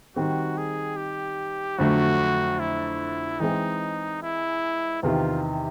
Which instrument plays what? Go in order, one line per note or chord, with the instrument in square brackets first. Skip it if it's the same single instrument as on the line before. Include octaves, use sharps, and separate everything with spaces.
[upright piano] D#3 G3 C4 [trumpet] F#4
[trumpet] G#4
G4
[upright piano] F2 D3 F#3 A3 [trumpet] F#4
[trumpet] E4
[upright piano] E3 G#3 C4 [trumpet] D#4
[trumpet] E4
[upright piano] E2 C3 D#3 [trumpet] F4